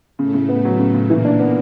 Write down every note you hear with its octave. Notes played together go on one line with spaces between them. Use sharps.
A2 C#3 A3
C#3
B3
F#3
C#3
C#3
A#2 E3 A#3
D4
B3